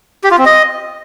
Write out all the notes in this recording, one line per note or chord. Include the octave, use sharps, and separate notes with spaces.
G4
F4
C4
D#5